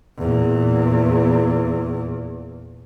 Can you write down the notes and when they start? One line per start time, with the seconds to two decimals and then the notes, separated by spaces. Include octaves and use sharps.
0.17 E2 A#2